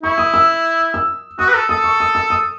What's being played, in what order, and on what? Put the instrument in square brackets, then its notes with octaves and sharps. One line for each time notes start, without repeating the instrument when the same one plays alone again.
[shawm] E4 [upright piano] C#6
[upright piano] D#6
E6
E6
[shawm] F#4 [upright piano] D#6
[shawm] B4
A4
[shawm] A4 [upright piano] D#6
[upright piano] C#6
D#6
E6
D#6